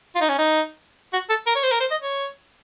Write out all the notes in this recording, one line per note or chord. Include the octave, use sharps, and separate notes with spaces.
F4
D#4
C#4
D#4
F#4
A4
A#4
C#5
C5
A#4
C5
D#5
C#5